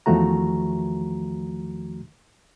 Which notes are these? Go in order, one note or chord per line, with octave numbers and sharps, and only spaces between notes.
E2 D#3 F3 A3 F#4 A#5